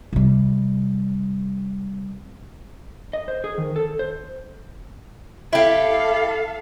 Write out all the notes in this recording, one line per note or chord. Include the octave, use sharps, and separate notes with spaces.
C3 G3
D#5
C5
G#4
D#3
A4
C5
E4 G4 A4 F5